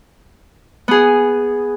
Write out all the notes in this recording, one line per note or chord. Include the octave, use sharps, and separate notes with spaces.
B3 G#4